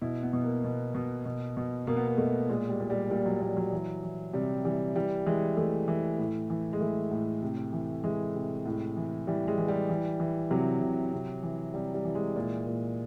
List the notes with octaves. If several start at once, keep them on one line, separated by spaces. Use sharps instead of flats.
B2 E4
B3
B2
A#3
B2
B2
B2
B2
B2 A#3
B3
A#3
B2 A3
A#2 G#3
G3
A#2
G3
A#2 G3
F#3
A#2 G3
F#3
E3
E3
C3 G3
E3 G3
E3 G3
E3 G#3
E3 A3
E3
A2
E3
G#3
E3 A3
A2
C3
E3
E3 G#3
C3
A2
E3
E3 G3
G#3
E3
G3
E3
E3
C3 F#3
C3
C3
E3
C3 G3
G3
E3
G#3
A#2
A#2